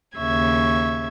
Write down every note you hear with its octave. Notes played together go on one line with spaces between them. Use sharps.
D#2 C#3 E5 C#6 G#6